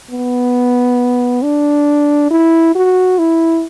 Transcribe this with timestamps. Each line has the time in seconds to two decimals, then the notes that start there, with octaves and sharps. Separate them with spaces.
0.11 B3
1.43 D4
2.30 E4
2.75 F#4
3.19 E4